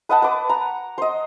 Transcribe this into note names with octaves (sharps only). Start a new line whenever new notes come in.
B4 D#5 F#5 A5
B4 D6
A#5
C5 D#5